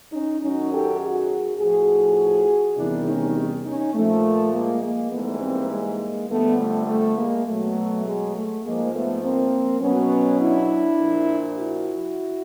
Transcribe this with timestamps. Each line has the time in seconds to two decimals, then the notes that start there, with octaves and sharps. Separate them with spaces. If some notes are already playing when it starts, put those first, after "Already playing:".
0.13 C#4 D#4
0.41 F#2 D#3 F#3 C#4 D#4
0.72 G4 A4
1.01 F#4 G#4
1.59 A2 F3 F#4 G#4
2.76 E2 C3 D#3 G3 D4 E4
3.06 C#4 D#4
3.65 C#4 D#4
3.94 A#2 F3 A3
4.53 G#3 A#3
4.82 G#3 A#3
5.11 G#2 E3 G3 A3 B3
5.41 A#3 C4
5.71 G#3 A#3
6.29 F2 D3 G3 A3 B3
6.58 A3
6.88 A3
7.18 G#3 A#3
7.47 B2 F#3 A3
8.05 G#3
8.34 A3
8.64 G#2 F3 G#3 A#3
8.93 A3 B3
9.22 A#3 C4
9.81 B2 F#3 B3 C#4
10.40 D4 E4
10.99 A#2 F3
11.58 E4 F#4